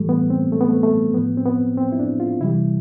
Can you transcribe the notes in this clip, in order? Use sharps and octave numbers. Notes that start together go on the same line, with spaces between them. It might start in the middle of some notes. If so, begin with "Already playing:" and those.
Already playing: A2 E3 G3 A3
B3
C4
A3
B3
A3
A3
A2 F3 B3
C4
B3
C4
E4
D4
F4
C3 E3 G3 E4